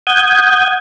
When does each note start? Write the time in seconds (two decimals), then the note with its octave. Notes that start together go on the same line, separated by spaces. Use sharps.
0.07 F#5 D#6 G6 G#6